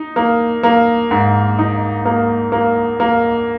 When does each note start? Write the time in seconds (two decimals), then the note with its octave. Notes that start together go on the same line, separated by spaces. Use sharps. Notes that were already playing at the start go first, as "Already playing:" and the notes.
Already playing: D#4
0.16 A#3
0.63 A#3
1.11 G#2
1.59 D#4
2.05 A#3
2.52 A#3
3.00 A#3